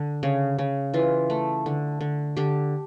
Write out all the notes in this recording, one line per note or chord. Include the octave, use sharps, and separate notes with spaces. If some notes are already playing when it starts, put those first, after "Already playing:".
Already playing: D3
C#3
C#3
E3 F4
A3
D3
D3
D3 G4